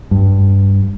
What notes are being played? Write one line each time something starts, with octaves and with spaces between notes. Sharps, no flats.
G2